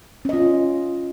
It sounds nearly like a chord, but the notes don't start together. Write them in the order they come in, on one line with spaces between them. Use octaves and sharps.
C#4 D#5 F4